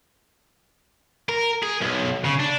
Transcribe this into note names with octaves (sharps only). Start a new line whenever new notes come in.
A#4
G#4
B1
C#3
D4